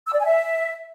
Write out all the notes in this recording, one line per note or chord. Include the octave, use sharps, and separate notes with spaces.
E6
D5
G#5
E5